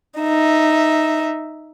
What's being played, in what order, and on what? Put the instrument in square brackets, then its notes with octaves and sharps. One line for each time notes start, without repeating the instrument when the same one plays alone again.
[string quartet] D#4 E5